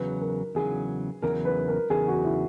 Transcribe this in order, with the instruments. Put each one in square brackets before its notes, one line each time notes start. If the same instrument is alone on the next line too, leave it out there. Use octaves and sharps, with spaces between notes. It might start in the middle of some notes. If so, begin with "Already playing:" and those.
Already playing: [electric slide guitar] E2 C#3 F#3 [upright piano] B4
[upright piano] A#4
[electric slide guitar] E2 C#3 F#3 [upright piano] G#4
[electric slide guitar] E2 C#3 F#3 [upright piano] A#4
[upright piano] B4
A#4
[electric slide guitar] E2 C#3 F#3 [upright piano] G#4
[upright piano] F#4
E4